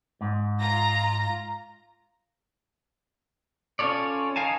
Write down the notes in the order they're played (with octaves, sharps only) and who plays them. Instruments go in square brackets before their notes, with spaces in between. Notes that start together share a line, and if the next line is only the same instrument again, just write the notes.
[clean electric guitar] G#2
[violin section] F4 A#5 A#6
[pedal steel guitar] C#4 F4 A4 C#5 D5
D#4 A#4 F5 G#5 A5